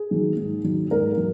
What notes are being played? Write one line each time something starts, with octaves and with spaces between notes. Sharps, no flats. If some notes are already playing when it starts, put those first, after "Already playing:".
Already playing: G#4
D#3 F#3
G#2
D#3 F#3
G#2 A#4
F#3